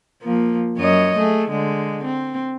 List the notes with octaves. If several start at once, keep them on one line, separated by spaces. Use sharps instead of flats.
F3 A#3
F#2 C#5 D#5
A3 G#4
D3 G#3
C4